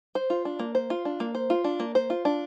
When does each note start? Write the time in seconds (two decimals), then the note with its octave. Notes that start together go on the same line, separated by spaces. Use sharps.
0.15 C5
0.30 F4
0.45 D4
0.59 A#3
0.75 C5
0.90 F4
1.05 D4
1.20 A#3
1.35 C5
1.50 F4
1.64 D4
1.80 A#3
1.95 C5
2.10 F4
2.25 D4